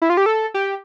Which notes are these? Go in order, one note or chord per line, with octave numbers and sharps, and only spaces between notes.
E4
F4
G4
A4
G4